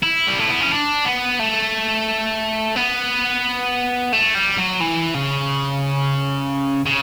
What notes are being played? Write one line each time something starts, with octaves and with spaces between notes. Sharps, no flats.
E4
G3
A3
B3
C#4
D4
B3
A3
B3
A3
G3
F#3
E3
C#3
C#3